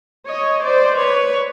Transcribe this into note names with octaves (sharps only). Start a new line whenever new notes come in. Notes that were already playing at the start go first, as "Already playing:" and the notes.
C#5 D#5
C5 D5
B4 C#5